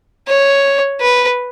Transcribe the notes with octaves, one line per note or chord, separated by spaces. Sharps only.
C#5
B4